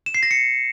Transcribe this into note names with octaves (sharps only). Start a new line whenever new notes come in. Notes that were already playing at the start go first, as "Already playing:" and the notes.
E7
C7
A#6
C#7